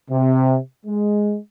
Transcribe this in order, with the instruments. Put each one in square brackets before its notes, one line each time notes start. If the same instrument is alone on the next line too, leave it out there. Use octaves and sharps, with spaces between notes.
[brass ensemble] C3
G#3